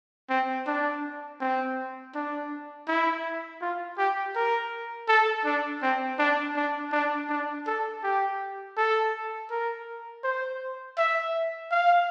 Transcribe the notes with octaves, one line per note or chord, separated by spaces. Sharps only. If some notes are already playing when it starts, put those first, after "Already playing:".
C4
D4
C4
D4
E4
F4
G4
A#4
A4
D4
C4
D4
D4
D4
D4
A4
G4
A4
A#4
C5
E5
F5